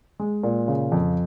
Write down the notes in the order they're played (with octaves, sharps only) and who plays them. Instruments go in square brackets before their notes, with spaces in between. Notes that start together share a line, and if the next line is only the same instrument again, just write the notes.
[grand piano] G#3
A#2
C#3
F2